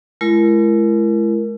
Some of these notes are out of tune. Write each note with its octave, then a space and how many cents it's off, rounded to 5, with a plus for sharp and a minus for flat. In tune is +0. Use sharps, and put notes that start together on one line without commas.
G#3 +40 E4 +40 A#4 +0